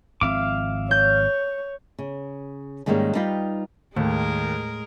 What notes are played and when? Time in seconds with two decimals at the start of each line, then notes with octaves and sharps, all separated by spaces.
0.21 G#1 F3 C4 E5 F5 D6
0.91 C#5 G6
1.99 C#3
2.86 G#2 D#3 G3 G#3 A#3 C#4
3.15 G3 D#4 F4 B4 F5 G5
3.96 D#2 A2 G#3 A#4